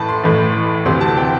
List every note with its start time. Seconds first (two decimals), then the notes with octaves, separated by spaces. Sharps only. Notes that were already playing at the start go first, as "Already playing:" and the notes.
Already playing: A1 A2 E3 A5 B5
0.09 C6
0.24 A1 A2 E3
0.85 D2 C3 E3 C6
1.01 A5
1.17 G5